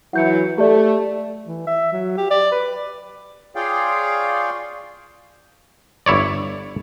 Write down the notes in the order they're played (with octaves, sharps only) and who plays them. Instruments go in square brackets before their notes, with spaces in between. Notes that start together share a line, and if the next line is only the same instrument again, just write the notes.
[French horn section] E3 F#3 E4 [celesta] F#5 G6 C#7
[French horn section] A3 [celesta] G4 D5
[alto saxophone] E3
E5
F#3
G4
D5
B4
[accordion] F4 G#4 C#5 D5 F5 G5
[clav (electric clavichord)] G1 E4 C#5 D5